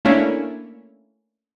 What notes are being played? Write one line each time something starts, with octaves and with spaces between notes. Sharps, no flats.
A3 A#3 C#4 D4 E4